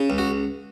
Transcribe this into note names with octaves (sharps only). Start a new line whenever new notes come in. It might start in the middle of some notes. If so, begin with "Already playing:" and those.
Already playing: C#3
C#2
F#4